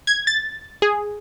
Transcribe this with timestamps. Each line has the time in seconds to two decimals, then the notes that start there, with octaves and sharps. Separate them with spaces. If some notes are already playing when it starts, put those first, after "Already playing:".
0.07 G#6
0.27 A6
0.82 G#4